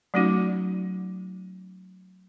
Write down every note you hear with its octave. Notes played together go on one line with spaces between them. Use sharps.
F#3 A3 C#4 D#4 F#4